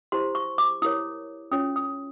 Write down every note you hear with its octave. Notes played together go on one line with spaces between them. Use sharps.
E4 G4 C5 C6
C#6
D6
E4 G4 A#4 C#5 D#6
C#4 F4 G#4 C#5 D#6
D#6